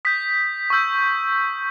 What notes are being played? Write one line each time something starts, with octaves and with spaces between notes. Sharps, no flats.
D#6 G6 B6
C#6 E6 G6